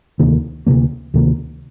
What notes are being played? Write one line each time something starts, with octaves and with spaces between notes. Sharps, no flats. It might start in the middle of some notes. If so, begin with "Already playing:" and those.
D2 C3 D#3 A#3
D2 C3 D#3 A#3
D2 C3 D#3 A#3